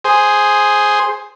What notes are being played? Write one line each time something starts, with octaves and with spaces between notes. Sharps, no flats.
G#4 C5